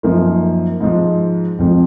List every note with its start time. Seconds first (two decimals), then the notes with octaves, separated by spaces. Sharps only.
0.03 F#2 F3 A#3 D#4
0.81 G#2 F3 G#3
1.59 F2 F3 G#3